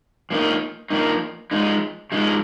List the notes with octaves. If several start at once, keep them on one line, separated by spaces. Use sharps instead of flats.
F3 A#3 D#4
F3 A#3 D#4
F3 G#3 D#4
F3 G#3 D#4